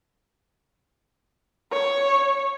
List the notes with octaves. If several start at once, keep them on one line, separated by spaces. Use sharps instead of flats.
C#5